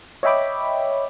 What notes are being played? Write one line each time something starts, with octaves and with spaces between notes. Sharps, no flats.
C#5 D#5 E5 G5 B5 D6